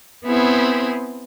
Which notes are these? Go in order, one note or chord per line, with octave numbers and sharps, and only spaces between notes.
B3 C4 E4 G#4